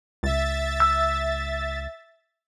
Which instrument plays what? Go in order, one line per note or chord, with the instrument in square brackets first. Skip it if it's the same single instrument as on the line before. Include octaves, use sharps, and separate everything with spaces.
[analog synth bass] C#2 [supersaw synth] E5 A6
[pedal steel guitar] E6